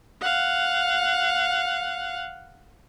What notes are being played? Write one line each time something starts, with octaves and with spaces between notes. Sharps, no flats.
F5 F#5